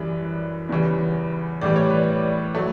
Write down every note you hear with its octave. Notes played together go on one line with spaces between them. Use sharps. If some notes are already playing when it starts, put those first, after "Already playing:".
Already playing: F#2 E3 G3 B4 D5
E2 C#3 E3 G3
A2 E3 G3 D5
C#5
B4
C#5
F#3 A3